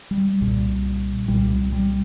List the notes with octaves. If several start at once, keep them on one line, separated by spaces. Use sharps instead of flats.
G3
C2 A#2
C2 A#2 G3
G3